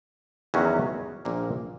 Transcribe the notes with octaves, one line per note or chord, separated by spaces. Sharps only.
E2 D#3 F#3 C#4 F#4
A#1 A#2 A#3